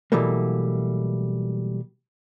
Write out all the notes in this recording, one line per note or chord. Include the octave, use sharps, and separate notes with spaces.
B2 E3 F#3 G3 A3 A#3